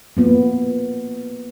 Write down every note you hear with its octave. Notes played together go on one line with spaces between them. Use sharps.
A#3 B3 F4